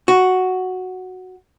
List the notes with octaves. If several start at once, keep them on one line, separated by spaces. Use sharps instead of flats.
F#4